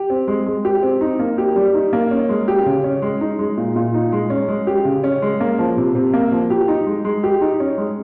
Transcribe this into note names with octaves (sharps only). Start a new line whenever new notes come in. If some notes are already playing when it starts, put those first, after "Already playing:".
Already playing: G4
C4
G#3
G#3
G4
C4
D#4
A#3
G4
G3
D#4
A#3
C#4
G#3
G4
C#3
C#4
G#3
D#4
G#3
A#2
A#2
D#4
G#3
C#4
G#3
G4
C#3
C#4
G#3
A#3
F3
C3
C3
A#3
F3
G4
D#4
G#3
G#3
G4
D#4
C#4
G#3